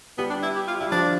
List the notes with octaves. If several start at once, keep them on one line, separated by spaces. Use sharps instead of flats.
G3 B3
D4
E4
G4
F4
G3 E4
F3 D4